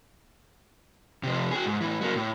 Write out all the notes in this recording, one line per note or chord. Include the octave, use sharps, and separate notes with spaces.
C3 F3
F#4 G#4
G#2
A2 E3
F#3 A#3
A2